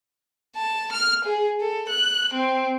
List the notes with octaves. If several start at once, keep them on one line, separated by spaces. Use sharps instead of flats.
A5
F6
G#4
A4
F#6
C4